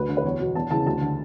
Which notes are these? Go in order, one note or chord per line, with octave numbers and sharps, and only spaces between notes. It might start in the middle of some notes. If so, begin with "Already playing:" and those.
Already playing: D2 B4
D3
B4
E2 C#5
B2
E2 A5
C#3 E3 A5
D2 A5
D3